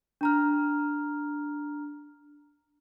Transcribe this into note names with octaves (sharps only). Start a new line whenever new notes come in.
D4 A#5 F6